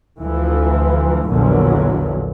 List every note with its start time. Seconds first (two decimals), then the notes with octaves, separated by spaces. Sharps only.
0.20 D2 E3 F3
1.27 A#1 E2 A#2 D3 F#3